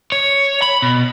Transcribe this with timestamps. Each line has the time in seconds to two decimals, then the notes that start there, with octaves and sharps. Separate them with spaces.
0.12 C#5
0.62 B5
0.82 B2